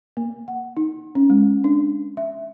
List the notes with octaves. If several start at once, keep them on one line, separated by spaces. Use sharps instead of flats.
A#3
F#5
D#4
C#4
G#3
D4
E5